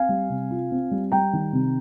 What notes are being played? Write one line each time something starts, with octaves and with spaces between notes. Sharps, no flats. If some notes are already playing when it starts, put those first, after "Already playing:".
Already playing: C4 F5 G#5
G3
C3
F4
C4
G3
G3 G5 A#5
D#3
C3